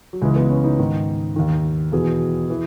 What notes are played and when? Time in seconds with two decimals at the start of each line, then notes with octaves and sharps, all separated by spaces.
0.13 F#3
0.22 C#2 C#3 E3 G#3
0.36 B3
0.50 C#4
0.64 D#4
0.79 G#2 D#3
1.36 D#2 D#3
1.92 E2 B2 G#4
2.50 E3